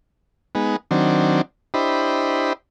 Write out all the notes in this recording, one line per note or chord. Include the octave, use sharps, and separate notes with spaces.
G#3 B3 D#4
D#3 F#3 C4 D4
D4 E4 G4 C5 D#5 B5